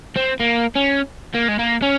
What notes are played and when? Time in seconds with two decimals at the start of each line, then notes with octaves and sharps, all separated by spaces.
0.16 C4
0.41 A#3
0.76 C#4
1.34 A#3
1.48 G#3
1.59 A#3
1.82 C#4